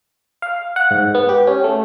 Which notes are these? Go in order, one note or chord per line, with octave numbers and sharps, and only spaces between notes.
F5
F#5
G#2
B3
G4
C#4
A3